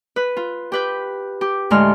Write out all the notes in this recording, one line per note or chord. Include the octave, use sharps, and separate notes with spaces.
B4
F4
G4 B4 G6
G4
D2 A2 G#3 C6 F6